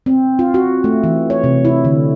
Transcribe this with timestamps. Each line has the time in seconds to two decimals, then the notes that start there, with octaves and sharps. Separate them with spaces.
0.06 C4
0.39 F4
0.54 F#4
0.84 A3
1.04 E3
1.30 C#5
1.44 C3
1.65 E4
1.85 D3